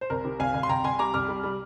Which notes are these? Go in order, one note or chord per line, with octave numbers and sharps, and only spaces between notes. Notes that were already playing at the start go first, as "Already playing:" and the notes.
C5
C2 A#4
C3
C2 F5 G#5
C2
C6
C2 G5 A#5
C2 G#5 C6
G3 A#5 D6
C2 D6 F6
G3
G3